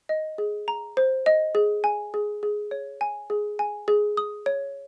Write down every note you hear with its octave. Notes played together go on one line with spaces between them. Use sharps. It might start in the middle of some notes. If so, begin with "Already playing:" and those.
D#5
G#4
A#5
C5
D#5
G#4
G#5
G#4
G#4
C#5
G#5
G#4
G#5
G#4
D#6
C#5